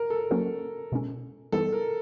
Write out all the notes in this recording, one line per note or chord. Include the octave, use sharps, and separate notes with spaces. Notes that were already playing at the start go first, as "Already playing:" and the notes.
Already playing: A#4
A4
F#3 A#3 C#4 F#4 A#4
B2 G#3 C#4
E3 G3 B3 D#4 A4
A#4